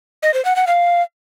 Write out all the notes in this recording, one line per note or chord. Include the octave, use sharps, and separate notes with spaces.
D#5
C5
F#5
F#5
F5